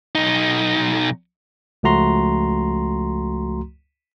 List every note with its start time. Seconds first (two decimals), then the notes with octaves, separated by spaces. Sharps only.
0.15 B1 D#4
1.83 C#2 F3 A3 F#4 A#5 C6